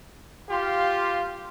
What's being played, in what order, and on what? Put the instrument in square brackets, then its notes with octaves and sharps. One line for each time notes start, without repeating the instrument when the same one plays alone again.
[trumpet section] F4 G4 F5 C6